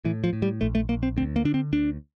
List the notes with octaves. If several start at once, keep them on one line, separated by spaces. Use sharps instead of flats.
A2 E3
F3
A2
G3
A#1 A3
A3
A#1 A#3
C4
D2 C4
A#3
D3 D4
C4
D2 D4